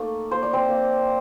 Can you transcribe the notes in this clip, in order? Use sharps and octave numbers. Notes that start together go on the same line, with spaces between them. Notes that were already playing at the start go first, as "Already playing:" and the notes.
Already playing: A3 A#3 D#4 A4
A#3 C5
D5
C4 C5
A#3